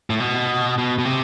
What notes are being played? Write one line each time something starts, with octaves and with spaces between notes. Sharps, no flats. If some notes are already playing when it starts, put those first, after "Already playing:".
A2
B2
B2
B2
C3